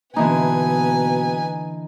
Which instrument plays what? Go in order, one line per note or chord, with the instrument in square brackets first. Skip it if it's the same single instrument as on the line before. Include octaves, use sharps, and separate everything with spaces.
[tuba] B2 [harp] D3 E3 A#3 [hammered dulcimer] D#4 [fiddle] B4 G#5